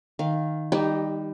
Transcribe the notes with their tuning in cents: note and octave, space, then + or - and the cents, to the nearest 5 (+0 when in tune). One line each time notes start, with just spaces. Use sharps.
D#3 +0 F5 +0
G3 +15 D#4 +0 G4 -15